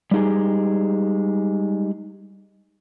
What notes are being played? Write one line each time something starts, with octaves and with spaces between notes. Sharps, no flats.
G3 G#3 D#4 G4 G#4